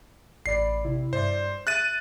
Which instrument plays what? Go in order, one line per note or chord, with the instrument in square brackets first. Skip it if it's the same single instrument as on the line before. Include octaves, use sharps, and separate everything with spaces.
[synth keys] A1 D5 B5 [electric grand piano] C7
[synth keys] C3 E4
[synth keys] G2 D5 E5 [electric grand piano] C5
[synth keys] E5 [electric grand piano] F#6 A6 D#7